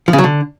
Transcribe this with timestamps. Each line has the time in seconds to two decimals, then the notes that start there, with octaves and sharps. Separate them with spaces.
0.08 F3
0.13 C#3
0.18 F#3
0.24 D3